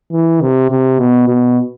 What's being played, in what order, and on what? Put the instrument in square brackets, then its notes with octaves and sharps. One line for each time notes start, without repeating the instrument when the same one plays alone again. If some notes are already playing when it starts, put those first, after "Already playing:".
[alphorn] E3
C3
C3
B2
B2